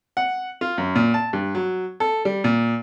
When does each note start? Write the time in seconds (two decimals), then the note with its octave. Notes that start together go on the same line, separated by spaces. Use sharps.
0.17 F#5
0.61 F4
0.78 F#2
0.95 A#2
1.14 A5
1.33 G2
1.55 F#3
2.00 A4
2.25 G3
2.44 A#2